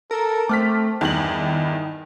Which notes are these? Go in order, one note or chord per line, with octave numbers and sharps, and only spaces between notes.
A4 A#4
A3 C4 D6 F6 B6
E2 G2 D#3 E4 F#7